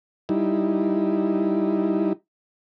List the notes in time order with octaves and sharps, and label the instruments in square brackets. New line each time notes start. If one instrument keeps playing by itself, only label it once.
[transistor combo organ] G3 D#4 E4